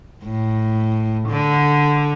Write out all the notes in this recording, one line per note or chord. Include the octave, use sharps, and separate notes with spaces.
A2
D3